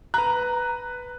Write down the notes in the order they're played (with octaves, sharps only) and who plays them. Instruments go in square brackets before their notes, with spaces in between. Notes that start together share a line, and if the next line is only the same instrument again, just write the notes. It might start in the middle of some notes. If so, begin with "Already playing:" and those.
[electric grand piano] B4 F#6 [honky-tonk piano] A#5